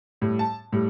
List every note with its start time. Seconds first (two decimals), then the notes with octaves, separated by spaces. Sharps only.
0.21 A2 G3
0.39 A5
0.73 A2 G3